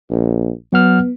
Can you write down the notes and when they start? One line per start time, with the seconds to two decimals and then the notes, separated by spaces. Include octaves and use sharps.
0.11 A#1
0.73 F#3 B3 F#5 F6